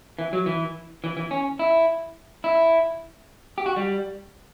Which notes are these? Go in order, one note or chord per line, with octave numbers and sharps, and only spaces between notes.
E3
F#3
E3
E3
E3
C#4
E4
E4
G4
F#4
G3